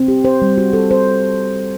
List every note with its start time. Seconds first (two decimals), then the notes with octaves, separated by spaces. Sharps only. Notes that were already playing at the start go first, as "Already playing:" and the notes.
Already playing: C4
0.08 G4
0.25 C5
0.42 G3
0.58 F#4
0.73 A4
0.91 C5